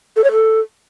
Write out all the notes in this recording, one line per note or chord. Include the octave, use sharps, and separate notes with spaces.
A4
C#5
A4